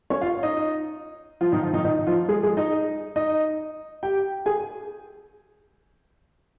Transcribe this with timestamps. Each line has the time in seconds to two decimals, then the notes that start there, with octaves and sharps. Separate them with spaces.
0.10 C#4 C#5
0.21 F4 F5
0.43 D#4 D#5
1.41 F3 F4
1.52 D#3 D#4
1.63 F3 F4
1.73 D#3 D#4
1.85 D#3 D#4
2.07 F3 F4
2.28 G#3 G#4
2.43 G#3 G#4
2.57 D#4 D#5
3.16 D#4 D#5
4.03 G4 G5
4.46 G#4 G#5